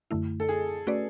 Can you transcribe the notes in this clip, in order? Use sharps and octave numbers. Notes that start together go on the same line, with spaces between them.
F#2 D3 A3 E4
A4
G#4
A3 C#4 F#4 B4 D5